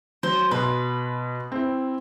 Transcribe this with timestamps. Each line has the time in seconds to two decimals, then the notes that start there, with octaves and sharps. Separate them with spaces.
0.23 F#3 C5
0.51 B2 B4 C6
1.52 C4 E4